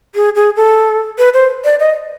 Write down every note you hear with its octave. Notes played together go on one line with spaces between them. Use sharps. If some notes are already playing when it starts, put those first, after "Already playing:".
G#4
G#4
A4
B4
C5
D5
D#5